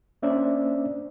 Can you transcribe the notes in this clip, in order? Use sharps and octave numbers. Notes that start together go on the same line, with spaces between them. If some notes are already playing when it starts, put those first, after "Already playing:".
A#3 C#4 D4 C5 D5 E5